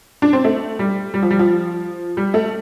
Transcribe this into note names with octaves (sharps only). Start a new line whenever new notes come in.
D4
C4
A3
G3
G3
F3
G3
F3
G3
A3